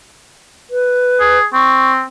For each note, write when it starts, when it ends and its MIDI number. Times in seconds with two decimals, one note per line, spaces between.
0.70 1.38 71
1.20 1.45 68
1.53 2.03 60
1.53 1.92 85